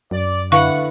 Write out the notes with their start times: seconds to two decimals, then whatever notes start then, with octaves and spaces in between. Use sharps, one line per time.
0.11 F#2 D5
0.52 D3 E4 B4 F5 F#5 C#6